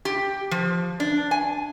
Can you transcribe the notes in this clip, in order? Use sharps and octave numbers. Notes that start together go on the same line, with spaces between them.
G4
F3
D4
G#5